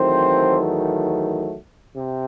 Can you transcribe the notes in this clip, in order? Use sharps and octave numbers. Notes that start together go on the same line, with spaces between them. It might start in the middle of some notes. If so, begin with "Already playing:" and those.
Already playing: E2 D#3 F#3 A3 C4 C5
C3